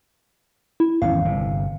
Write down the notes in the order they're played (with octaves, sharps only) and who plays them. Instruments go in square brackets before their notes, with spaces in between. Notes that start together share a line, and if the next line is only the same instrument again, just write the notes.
[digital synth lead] E4
[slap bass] G#1 E2 C#4 [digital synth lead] F5
[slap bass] G1 C3